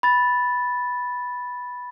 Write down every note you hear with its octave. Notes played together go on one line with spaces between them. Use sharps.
B5 A6